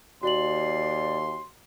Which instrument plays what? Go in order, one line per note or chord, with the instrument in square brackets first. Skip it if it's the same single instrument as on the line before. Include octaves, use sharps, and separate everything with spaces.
[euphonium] D#2 [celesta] F#4 F#7 [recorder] D5 [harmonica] C6